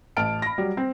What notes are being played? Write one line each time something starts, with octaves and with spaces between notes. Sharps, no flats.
A1 A5 F6 D7
B5 A#6
F#3 G3
C4